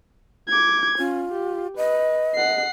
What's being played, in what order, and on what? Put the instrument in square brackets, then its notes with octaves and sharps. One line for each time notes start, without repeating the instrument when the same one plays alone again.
[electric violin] D6 G#6
[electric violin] C#4 [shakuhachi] F4
[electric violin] G4
[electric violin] B4 [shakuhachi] D#5
[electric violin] F#5 C7